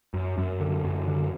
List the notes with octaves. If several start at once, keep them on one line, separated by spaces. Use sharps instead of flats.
F#2
F#2
D3
F#2
D3